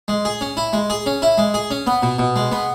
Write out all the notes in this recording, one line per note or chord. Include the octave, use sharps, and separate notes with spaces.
G#3
G#4
C#4
E4
G#3
G#4
C#4
E4
G#3
G#4
C#4
B3
B2
B2
G#3
B3